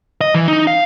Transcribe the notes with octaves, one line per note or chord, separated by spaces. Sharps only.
D#5
E3
D#4
F5